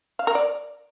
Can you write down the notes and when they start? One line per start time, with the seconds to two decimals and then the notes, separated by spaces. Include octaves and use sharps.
0.19 F5
0.27 A#4
0.35 D5